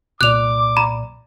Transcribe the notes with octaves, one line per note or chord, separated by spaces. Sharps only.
C2 A#2 D5 D6 F#6 F7
A#5 B5